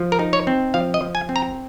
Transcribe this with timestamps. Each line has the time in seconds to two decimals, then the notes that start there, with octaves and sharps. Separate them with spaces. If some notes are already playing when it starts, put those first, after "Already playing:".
Already playing: F3
0.12 A#4
0.19 D#4
0.33 C#5
0.47 C4
0.74 F3 F5
0.94 D#5
1.02 F3
1.15 G#5
1.29 C4
1.36 A#5